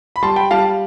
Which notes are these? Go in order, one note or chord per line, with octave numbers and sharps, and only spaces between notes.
B5
G3 A5 C6
G5 B5
G3 F5 A5